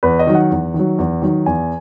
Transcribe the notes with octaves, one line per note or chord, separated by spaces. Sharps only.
E2 B4
D#5
D#3 F#3
F#5
E2
D#3
F#3
E2
D#3 F#3
E2 G#5